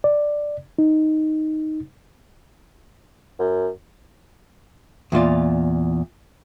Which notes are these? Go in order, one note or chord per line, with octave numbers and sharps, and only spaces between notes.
D5
D#4
F#2
E2 A#2 F4 D5